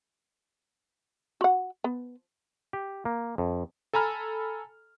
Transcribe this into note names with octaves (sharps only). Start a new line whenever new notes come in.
F#4 F#5
B3
G4
A#3
F2
A4 G#5 A#5 B5 F6